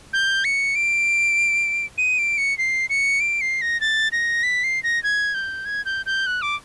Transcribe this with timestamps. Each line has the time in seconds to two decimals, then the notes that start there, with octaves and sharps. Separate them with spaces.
0.13 G6
0.45 C#7
0.75 D7
1.98 D#7
2.19 D7
2.38 C#7
2.58 C7
2.89 C#7
3.20 D7
3.41 C7
3.61 A#6
3.81 A6
4.12 A#6
4.43 B6
4.64 C7
4.83 A#6
5.03 G#6
5.34 G6
5.65 G#6
5.85 G6
6.06 G6
6.27 F#6
6.42 D6